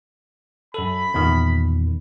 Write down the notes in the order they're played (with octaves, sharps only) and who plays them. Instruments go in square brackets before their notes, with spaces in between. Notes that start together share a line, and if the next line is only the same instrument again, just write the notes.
[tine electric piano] F#2 A4 [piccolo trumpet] B5
[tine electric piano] E2 A#2 D#3